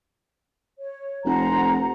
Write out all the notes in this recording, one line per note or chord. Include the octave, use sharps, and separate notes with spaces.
C#5
F1 C5 F#5 A#5